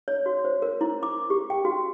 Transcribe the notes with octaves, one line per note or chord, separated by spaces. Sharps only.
C#5
F#4
C5
A#4
E4
D6
G4
G5
F#4